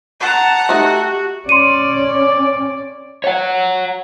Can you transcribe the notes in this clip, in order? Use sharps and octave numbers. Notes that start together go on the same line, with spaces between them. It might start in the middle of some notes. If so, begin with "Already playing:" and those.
F#5 A5 A#5
A3 D#4 F#4 G4
C#4 D5 C6 C#7 D#7
C#5 F#5